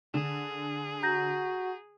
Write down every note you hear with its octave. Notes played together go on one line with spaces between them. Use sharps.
D3 G#4 E7
F#4 A#5 G6 A#6